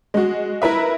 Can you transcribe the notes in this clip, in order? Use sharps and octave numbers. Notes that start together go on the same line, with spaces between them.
G#3 F#4
E4 A#4 B4 E5